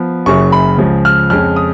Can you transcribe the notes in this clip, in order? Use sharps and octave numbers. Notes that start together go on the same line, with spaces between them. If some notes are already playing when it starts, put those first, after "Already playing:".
Already playing: F3 B3
F#1 F#2 C#3 F#3 C#6
B5
C#2 C#3 F3
F6
F2 C#3 G#3 C#4 F6
D#6